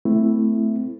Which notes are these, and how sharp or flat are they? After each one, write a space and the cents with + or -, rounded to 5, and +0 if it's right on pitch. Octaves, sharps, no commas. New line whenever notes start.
A3 +0 C4 -25 E4 +0